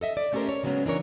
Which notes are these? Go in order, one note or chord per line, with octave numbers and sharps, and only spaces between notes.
A4 D#5 E5
D5
A3 C#4 G4 A4 A#4 C5
C#5
C#3 F#3 G#3 B3 C#4
E3 D4 A#4 C#5